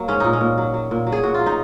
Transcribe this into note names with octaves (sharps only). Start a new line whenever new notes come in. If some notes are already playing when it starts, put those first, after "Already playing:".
Already playing: F#3 A#3
G#2 C#4
A#2 D#4
C#4
A#2
F#3
F#3
A#2
F#3
G#4
A#2 F#4
F4
F#3
D#4